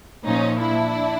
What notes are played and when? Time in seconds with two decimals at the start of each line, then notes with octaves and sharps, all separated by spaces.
0.26 A#2 F3 C#4 D#4
0.59 D4 E4